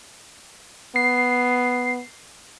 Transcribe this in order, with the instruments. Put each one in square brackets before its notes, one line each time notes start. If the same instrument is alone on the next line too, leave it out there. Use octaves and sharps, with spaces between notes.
[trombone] B3 [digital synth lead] C7